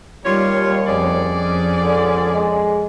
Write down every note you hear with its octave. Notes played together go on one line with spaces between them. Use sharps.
D#2 G3 F4 C#5
F2 C#4 G#4 D5
C#2 D3
G#3